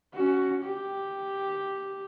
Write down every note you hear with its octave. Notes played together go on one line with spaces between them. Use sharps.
C#4 F#4
G4